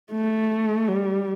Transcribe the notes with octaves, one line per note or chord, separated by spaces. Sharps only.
A3
G3